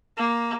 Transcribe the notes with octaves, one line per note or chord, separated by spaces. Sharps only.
A#3